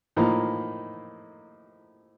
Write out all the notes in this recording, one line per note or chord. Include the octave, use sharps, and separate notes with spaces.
A2 F3 A#3 D#4